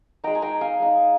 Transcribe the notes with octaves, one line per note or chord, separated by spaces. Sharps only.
G#3 D#4 G5 A#5
G#5
G5 A#5
F5 G#5
G#3 D#4